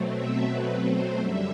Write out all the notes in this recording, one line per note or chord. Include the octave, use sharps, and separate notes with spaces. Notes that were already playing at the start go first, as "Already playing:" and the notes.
Already playing: B2 F#3 A3 C4
E5
B4
C5
F#2 D3 G3 E5